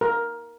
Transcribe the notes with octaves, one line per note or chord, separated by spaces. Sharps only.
A#4